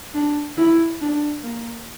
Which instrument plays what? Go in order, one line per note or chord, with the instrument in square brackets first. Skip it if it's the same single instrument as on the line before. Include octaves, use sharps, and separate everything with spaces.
[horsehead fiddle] D4
E4
D4
A#3